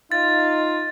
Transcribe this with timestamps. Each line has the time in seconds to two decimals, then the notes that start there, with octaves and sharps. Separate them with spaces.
0.12 D#4 F4 A6